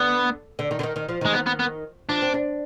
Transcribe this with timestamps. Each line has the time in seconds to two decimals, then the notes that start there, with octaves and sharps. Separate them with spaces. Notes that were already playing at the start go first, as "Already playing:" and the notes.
Already playing: D3 B3
0.59 D3
0.71 D#3
0.79 D3
0.83 D#3
0.96 D#3
1.09 F3
1.21 D#3 G#3
1.33 B3
1.46 B3
1.59 B3
2.09 F3 D4
2.22 C4
2.34 D4